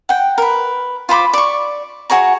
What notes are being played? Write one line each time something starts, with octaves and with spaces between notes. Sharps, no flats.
F#5 G5
A#4 B4
F4 C5 B5 D6
D5 C#6
F#4 G#4 C#5 A#5